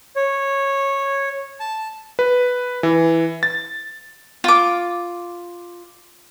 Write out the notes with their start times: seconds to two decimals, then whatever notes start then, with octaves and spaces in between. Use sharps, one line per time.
0.16 C#5
1.60 A5
2.19 B4
2.83 E3
3.43 A6
4.44 F4 D6